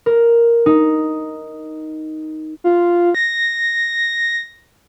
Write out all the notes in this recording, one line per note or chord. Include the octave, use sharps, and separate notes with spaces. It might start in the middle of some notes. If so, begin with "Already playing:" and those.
A#4
D#4
F4
A#6